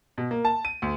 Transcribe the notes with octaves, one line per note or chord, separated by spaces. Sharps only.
B2
A#3
A5
D#7
D2